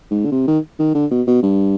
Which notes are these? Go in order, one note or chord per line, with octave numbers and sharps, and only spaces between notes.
G#2
D3
C3
D#3
D#3
D3
B2
B2
G2